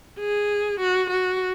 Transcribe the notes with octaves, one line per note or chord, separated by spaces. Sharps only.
G#4
F#4
F#4